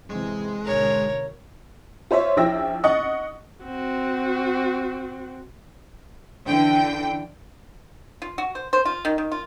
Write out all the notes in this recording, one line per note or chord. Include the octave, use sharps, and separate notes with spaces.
C3 E3 G#3 C4
G#1 B2 D3 A#4 C#5
F4 C5 C#5 E5
A#1 F3 E4 G5 E6 A#6
D#5 F#5 C#6 D#6 A6
C4 F#4
D3 E3 G5
F4
F#4
C5
C5
F4
D#3
D#3
F4